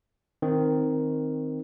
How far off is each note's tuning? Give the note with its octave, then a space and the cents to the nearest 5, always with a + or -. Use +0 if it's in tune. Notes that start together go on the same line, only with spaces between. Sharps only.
D#3 +0 C4 +0